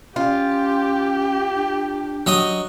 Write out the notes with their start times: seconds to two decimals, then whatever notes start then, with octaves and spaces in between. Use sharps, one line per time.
0.16 C#4 F4 G4
1.55 D4
2.27 F#3 D#5